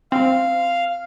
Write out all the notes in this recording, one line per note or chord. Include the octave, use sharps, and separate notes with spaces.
C4 F5